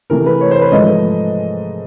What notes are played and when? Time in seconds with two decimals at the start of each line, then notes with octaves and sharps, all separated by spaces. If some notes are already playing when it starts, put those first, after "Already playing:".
0.10 C3 E3 A3 A#4
0.26 B4
0.41 C#5
0.51 C5
0.61 B4
0.72 G#2 F3 A3 D#5